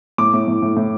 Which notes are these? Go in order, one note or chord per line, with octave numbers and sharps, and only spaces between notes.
A2 D6
A2
A2
A2
A2